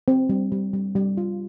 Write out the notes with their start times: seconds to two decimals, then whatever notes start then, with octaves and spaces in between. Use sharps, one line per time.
0.08 C4
0.29 G3
0.52 G3
0.74 G3
0.96 G3
1.17 F4